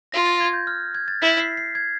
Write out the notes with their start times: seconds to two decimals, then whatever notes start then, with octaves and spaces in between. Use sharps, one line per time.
0.12 F4 A#6
0.27 A6
0.41 G#6
0.53 G6
0.67 F6
0.95 G#6
1.08 A6
1.22 E4 B6
1.40 C7
1.57 C7
1.75 G#6